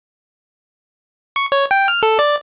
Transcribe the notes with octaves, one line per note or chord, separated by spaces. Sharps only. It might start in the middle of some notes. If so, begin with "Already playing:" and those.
C#6
C#5
G5
F6
A4
D5